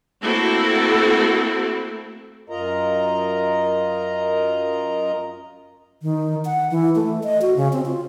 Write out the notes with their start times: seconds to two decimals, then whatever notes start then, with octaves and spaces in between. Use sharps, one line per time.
0.20 A3 A#3 C4 E4 F#4 A4
2.49 F#2 F4 A#4 D#5 A#5
6.03 D#3
6.45 F#5
6.71 E3
6.95 A3
7.23 D#5
7.42 F#4
7.56 C#3
7.73 C4
7.86 F4